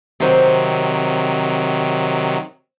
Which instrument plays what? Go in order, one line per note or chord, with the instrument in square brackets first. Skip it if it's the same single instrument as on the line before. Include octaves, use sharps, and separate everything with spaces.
[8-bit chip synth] C3 D#3 F#3 [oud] C4 C5